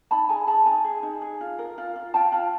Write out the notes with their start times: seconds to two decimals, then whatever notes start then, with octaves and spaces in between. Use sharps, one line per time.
0.11 D#4 A5 B5
0.29 G#4 G#5 A#5
0.47 G#4 A5 B5
0.66 D#4 G#5 A#5
0.85 G#4
1.03 D#4
1.22 G#4
1.41 F4
1.59 A#4
1.78 F4
1.96 F4
2.14 F4 G5 A5
2.32 F4